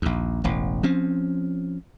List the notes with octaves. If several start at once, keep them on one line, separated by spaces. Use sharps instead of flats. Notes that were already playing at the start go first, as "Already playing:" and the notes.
A#1 D#2
E1 A1
F3 C4 C#4